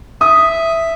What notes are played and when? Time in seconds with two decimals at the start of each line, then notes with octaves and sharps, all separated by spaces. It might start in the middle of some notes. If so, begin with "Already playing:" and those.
0.21 E5 D#6